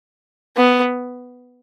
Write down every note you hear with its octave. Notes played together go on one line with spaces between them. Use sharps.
B3